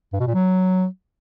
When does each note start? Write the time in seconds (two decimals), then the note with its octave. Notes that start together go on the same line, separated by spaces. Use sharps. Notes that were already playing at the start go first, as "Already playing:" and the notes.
0.13 G2
0.20 B2
0.27 A#2
0.34 F#3